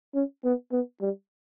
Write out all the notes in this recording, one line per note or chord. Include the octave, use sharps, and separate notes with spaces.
C#4
B3
B3
G3